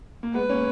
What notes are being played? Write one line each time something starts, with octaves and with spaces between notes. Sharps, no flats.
A#3
G#3 B3 B4
A#3 C#4